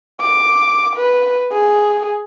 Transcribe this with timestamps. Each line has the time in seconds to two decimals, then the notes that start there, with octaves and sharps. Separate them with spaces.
0.20 D6
0.96 B4
1.52 G#4